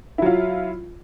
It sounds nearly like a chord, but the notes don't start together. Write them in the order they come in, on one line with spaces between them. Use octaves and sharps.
E4 F#3 F4